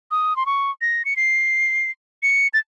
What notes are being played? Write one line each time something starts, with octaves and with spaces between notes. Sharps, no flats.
D#6
C6
C#6
A#6
C#7
C7
C#7
A6